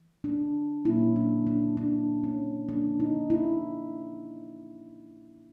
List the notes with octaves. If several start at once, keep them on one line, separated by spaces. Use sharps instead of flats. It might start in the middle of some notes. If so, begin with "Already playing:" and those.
Already playing: E3
D4
A#2 F#3 A#3 C#4 E4
D4
D4
D4
C#4
F3 A#3 C#4 D4
D#4
E4